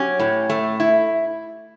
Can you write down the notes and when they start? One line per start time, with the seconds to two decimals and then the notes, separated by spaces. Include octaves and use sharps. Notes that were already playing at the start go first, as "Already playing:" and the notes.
Already playing: F#3 C#4 G4
0.19 A2
0.50 A3
0.80 E4